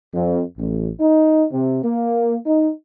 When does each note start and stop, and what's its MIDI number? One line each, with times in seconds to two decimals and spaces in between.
0.14 0.42 41
0.58 0.90 33
1.00 1.44 63
1.52 1.80 48
1.84 2.34 58
2.46 2.69 63